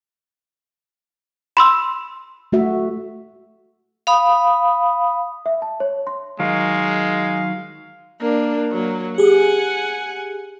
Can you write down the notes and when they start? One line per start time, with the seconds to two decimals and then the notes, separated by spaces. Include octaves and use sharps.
1.57 B5 C6 E6
2.52 A3 F#4 E5
4.07 F5 B5 D#6
5.46 E5
5.62 A5
5.80 C#5
6.07 C6
6.40 D#3 F#3 G#3 F5
8.20 A#3 D4
8.72 F#3 A#3
9.18 G4 G#4 F#5 G#5